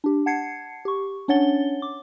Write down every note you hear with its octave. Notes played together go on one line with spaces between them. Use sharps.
D4 G4
F#5 A5 G#6 C7 C#7
G4 C#6
C#4 D4 C#5 F#5 A6 G7
D6